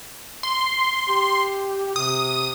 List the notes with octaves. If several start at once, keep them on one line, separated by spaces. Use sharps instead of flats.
C6
G4
C3 D#6